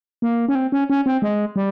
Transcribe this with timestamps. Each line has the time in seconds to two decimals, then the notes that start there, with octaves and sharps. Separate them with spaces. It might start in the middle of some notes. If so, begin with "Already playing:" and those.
0.22 A#3
0.48 C#4
0.55 C4
0.72 C#4
0.90 C#4
1.06 C4
1.22 G#3
1.56 G3